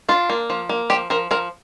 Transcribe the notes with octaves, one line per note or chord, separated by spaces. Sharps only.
D4 F4
A#3
F3
A#3
F3 G4
F3 A#4
F3 A#4